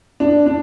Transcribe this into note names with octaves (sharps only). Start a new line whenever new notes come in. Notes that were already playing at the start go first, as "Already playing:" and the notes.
D4
D4